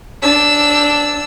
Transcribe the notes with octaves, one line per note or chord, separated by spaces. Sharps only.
D4 E6